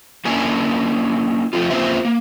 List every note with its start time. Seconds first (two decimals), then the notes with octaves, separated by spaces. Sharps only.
0.25 A#3 C#4 D4 E4 A#4 G#5
1.53 F3 A3 C4 F4
1.70 A#3 C4 C#4 F4 C5 E5
2.05 A#3